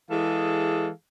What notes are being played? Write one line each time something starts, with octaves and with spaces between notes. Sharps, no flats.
E3 G#3 G#4 A4 F5